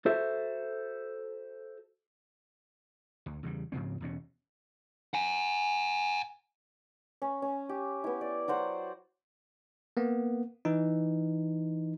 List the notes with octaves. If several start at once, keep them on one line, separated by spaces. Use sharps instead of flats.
F#4 A4 C5 E5
D2
E2 C#3 G3
G#2 C#3 F3 C4
E1 E2 B2 C#4
F#5 G#5
C#4
C#4
G4
B3 E4
D5
F#3 F#4 C5 F#5
A#3 B3
E3 D#4